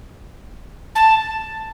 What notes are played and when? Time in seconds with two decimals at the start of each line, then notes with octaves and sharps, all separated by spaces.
0.95 A5